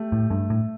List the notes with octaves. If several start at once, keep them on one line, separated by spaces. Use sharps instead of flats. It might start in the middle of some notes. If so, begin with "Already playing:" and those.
Already playing: A3 G4
A2
G2 A3
A2